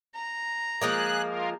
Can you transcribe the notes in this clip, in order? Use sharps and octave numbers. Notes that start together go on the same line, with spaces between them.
A#5
F3 G#3 A#3 G#4 F#6
F4 A#4